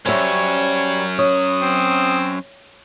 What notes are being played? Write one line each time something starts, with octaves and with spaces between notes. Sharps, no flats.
F#2 G3 C#4 C5 C#5 E5
C#5 D#6
C4